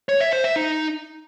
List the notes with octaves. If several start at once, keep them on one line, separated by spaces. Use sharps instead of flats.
C#5
E5
C5
E5
D#4